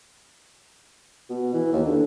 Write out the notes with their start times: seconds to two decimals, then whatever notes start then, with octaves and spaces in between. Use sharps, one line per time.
1.30 B2
1.53 E3
1.72 D#2
1.85 D3